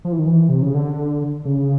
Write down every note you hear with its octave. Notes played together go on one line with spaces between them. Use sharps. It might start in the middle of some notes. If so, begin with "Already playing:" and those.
F3
E3
D#3
E3
C3
C#3
D3
C#3